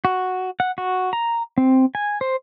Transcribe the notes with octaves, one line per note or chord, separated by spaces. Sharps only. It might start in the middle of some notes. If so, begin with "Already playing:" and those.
F#4
F#5
F#4
A#5
C4
G#5
C5